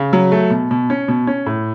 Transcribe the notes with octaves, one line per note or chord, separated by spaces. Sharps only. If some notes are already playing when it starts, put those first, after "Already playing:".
Already playing: C#3
F#3
A3
B2
B2
C#4
B2
C#4
A2